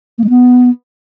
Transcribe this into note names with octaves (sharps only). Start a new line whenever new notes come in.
A#3
G#3
B3